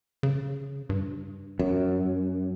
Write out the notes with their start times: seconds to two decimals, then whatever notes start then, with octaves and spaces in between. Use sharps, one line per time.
0.23 C#3
0.89 G2
1.59 F#2